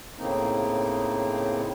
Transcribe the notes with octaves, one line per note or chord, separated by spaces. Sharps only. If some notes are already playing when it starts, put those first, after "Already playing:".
A2 C#3 A#3 C4 D#4